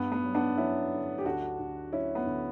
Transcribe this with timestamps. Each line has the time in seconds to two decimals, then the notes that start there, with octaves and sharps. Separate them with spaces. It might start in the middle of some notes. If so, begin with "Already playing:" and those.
Already playing: G2 B3
0.12 B3
0.24 F#3
0.35 B3 D4
0.57 F#3 C#4 E4
0.91 D3
1.18 G4
1.24 D2 D4 F#4
1.59 D2
1.92 F#3 C#4 E4
2.15 B3
2.27 D2